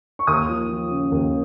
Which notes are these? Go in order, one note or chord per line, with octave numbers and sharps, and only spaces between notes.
C#6
D#2 D#6
F3
F3
C#3
D#2